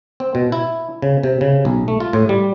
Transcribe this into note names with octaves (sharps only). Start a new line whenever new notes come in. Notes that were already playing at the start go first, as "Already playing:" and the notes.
C4
B2
E4
C#3
C3
C#3
B1
A3
F4
A2
G3